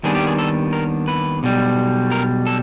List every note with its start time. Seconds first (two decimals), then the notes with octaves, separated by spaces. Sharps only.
0.03 D#2 D#3 G3 B3 D4 G#4
0.15 G4
0.27 G#4
0.39 A4
0.73 A#4
1.08 B4
1.43 B1 B2 G3
2.11 A#4
2.47 A4